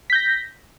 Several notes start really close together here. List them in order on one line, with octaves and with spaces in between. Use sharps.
B6 G6 A#6